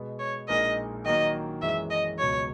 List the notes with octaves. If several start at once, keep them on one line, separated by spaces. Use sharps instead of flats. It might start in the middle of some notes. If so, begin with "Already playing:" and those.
Already playing: B2 G#3 B3
C#5
A#1 A#2 G#3 D#4 A#4 D#5
D#3 F#3 A#3 D#5
F#2 E3 G#3 E5
D#5
C#2 B2 F#3 C#5